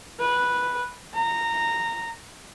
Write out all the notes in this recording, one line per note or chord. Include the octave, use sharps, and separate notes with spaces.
B4
A#5